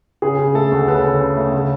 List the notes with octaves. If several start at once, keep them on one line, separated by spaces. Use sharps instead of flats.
C#3 G#4
C#3
A3 A4
D2
C#3 A4 B4
C#3
C#3
A3
C#3